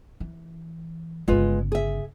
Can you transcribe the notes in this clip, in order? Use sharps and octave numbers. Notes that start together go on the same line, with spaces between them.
E3
G1 C#3 G#3 F4 B4
G#4 E5